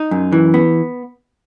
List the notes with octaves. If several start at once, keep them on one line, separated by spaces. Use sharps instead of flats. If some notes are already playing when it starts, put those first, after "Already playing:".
Already playing: D#4
F#2
E3
B3